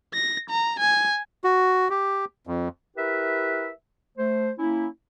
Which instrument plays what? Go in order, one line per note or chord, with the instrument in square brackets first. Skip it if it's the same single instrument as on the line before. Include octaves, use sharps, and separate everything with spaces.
[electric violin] A#6
A#5
G#5
[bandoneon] F#4
G4
F2
[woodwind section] E4 G4 A#4 B4 E5
A3 C5
A#3 C#4 E4